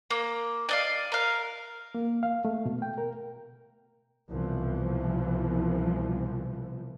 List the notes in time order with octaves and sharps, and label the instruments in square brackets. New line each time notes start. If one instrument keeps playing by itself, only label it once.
[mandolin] A#3
D5 D#5 F5
A#4 F5
[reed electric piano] A#3
F5
A3
B2
G5
A#4
[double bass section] C2 B2 E3 F3